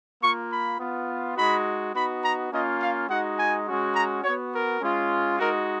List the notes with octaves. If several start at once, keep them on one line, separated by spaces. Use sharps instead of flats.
A#3 F4 C#6
B5
B3 F4
G#3 D#4 F#4 B5
B3 D#4 F#4 B5
A#5
A#3 C#4 F4 D#5
F5
G#3 D#4 F#4 F#5
G#5
G#3 C#4 F#4
A#5
B3 F#4 C#5
A#4
G#3 C#4 F4
G#3 D#4 F#4 A#4